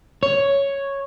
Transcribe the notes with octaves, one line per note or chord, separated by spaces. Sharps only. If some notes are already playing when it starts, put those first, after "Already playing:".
C#5